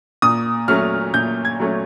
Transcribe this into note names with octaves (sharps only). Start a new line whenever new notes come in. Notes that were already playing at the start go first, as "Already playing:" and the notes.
A#2 D#6
F#3 A3 C#4 F6
A#2 G6
G#6
F#3 A3 C#4